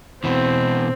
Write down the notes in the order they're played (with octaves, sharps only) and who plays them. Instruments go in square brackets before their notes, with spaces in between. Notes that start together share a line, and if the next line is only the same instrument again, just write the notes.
[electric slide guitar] B2 E3 [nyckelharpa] C4